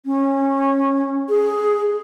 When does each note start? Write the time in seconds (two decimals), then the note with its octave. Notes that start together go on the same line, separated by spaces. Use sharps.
0.06 C#4
1.29 G#4